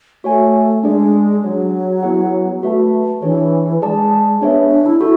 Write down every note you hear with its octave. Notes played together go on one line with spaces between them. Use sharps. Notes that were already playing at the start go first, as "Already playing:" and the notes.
A3 F#4 C#5 G#5
G#3 D4 G#4 D5
F#3 D4 G#4 C#5
B3 E4 G#4 C#5 F#5
A3 F#4 B4 E5 A5
E3 D4 G#4 C#5
G#3 G#4 D5 A5
B3 D4 G#4 C#5 E5
D4
E4
E4 F#4 A4